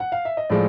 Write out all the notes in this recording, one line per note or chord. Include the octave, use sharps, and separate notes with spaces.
F#5
F5
E5
D#5
A2 F3 G#3 D5